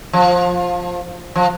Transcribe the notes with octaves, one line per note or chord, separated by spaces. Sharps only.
F3
F3